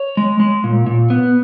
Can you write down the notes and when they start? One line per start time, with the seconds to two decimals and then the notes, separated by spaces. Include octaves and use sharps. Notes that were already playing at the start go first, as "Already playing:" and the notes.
Already playing: C#5
0.17 G#3
0.40 G#3
0.64 A#2
0.86 A#2
1.10 B3